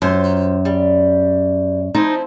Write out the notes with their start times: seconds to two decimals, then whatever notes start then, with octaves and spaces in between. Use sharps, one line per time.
0.02 F#2 F4 C5
0.65 G3
1.95 F3 C4 D#4 E4